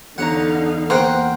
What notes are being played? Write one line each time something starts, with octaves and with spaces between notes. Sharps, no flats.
E2 D3 D#4 C#5 F5 F#5 A#5
A#3 A#4 C5 F#5 G5